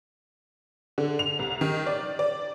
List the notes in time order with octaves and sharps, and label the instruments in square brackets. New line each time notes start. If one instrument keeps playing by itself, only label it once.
[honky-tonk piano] D3
F7
C2
D#3
D5
D5